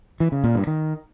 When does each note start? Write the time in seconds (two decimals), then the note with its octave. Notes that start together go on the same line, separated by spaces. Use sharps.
0.20 E3
0.32 C#3
0.44 A#2
0.55 G2
0.67 D#3